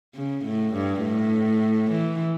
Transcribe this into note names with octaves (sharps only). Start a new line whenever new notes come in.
C#3
A2
G2
A2
E3